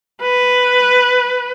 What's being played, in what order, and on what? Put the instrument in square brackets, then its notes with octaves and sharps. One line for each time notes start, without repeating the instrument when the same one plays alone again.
[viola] B4